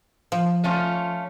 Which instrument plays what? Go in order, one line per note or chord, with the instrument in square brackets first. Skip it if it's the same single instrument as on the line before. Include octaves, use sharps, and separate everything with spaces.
[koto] F3
[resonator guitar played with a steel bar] A3 C#4 F4